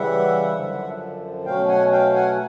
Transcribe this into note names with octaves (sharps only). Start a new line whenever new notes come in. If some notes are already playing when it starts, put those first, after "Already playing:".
Already playing: C#3 E3 G3 E5 F#5
F#2 D3 F3
B2 F#3 A3 C#4 F5 G5
F#5 G#5
F5 G5
F#5 G#5